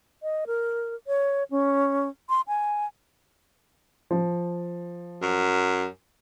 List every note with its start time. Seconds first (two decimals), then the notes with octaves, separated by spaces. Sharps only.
0.23 D#5
0.47 A#4
1.07 C#5
1.51 C#4
2.29 C6
2.48 G#5
4.11 F3
5.22 F#2